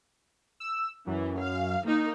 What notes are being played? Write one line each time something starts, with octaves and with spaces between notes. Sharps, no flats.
E6
F#2 E3
F5
D#3 A#3 D#4